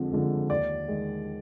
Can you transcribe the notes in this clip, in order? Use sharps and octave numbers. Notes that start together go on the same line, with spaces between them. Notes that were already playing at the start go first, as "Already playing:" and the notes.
Already playing: F2 D3 F3 G#3
D3 F3 G#3
D#2 D5
D#3 G#3